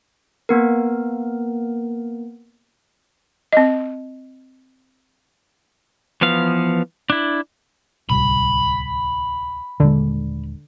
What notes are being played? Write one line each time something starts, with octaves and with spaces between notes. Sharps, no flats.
A#3 B3 A#4
C4 D#5
E3 F3 B3 F5
D4 E4
D1 C2 B5
D#1 D3 G#3